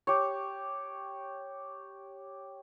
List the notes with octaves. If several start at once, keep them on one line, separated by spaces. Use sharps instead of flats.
G4 C#5